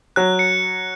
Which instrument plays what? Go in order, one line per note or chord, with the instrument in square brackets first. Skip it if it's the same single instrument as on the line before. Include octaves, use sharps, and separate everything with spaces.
[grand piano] F#3 [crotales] F#6
[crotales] C#7